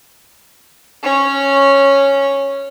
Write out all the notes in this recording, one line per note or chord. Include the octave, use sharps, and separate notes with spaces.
C#4 C#5